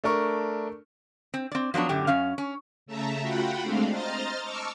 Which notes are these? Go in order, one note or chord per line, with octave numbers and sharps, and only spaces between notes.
A3 D4 A#4 C#6
C4
C4 D5
F3 F#3 B3 D4 C#5
F#2 A2 D3 G4
F#2 C#4 F5
C#4
C#3 A3 E5 A5 A#5
F4 F#4 F#5 G5 B5
G#3 A3 C4 D4 F5
C5 D#5 A#5 C6 F6 A6
A5 C#6 D6 E6 F6